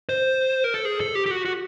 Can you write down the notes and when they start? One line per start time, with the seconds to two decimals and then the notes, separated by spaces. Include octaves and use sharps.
0.09 C5
0.64 A#4
0.74 A4
0.85 G#4
1.00 A4
1.15 G4
1.26 G4
1.31 F#4
1.45 F#4